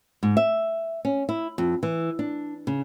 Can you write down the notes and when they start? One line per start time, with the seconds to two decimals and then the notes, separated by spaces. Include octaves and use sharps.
0.23 G#2
0.37 E5
1.05 C#4
1.29 E4
1.58 F2
1.83 E3
2.19 D4
2.67 C#3